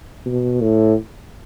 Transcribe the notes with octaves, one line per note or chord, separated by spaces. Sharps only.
B2
A2